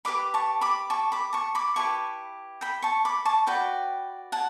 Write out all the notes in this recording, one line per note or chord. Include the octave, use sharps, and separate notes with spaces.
G4 B4 D5 B5 D6
A5 C#6
B5 D6
A5 C#6
B5 D6
A5 C#6
B5 D6
E4 G4 B4 A5 C#6
G5 B5
A5 C#6
B5 D6
A5 C#6
F#4 B4 D5 G5 B5
F#5 A5